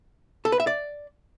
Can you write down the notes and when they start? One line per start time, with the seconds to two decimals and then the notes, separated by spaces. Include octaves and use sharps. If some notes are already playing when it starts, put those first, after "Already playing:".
0.45 A4
0.52 B4
0.60 E5
0.67 D5